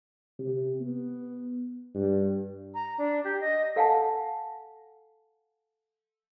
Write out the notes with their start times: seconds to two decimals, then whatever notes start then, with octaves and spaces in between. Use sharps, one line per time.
0.39 C3
0.80 B3
1.95 G2
2.74 A#5
2.98 D4
3.24 G4
3.40 D#5
3.76 A4 F5 F#5 G#5 A5